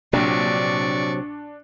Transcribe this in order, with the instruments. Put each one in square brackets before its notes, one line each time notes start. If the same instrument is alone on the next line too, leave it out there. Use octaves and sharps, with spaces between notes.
[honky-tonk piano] A#1 [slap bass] C3 F#3 [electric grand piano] D4 [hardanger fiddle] D5 C#6